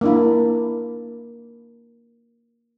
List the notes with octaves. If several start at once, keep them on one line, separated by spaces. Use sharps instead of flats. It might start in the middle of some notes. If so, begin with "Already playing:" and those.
A#3 D4 E4